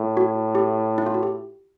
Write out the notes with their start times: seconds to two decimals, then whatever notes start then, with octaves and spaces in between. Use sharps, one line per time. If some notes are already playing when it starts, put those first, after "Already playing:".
Already playing: A2
0.17 F#4
0.55 G4
0.98 E4
1.06 F4
1.14 F#4
1.23 G4